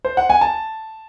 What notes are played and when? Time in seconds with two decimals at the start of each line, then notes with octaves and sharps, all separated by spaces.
0.05 C5
0.17 F#5
0.30 G#5
0.41 A5